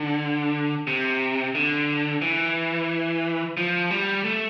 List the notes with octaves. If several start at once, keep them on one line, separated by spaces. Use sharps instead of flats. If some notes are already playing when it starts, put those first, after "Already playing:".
Already playing: D3
C3
D3
E3
F3
G3
A3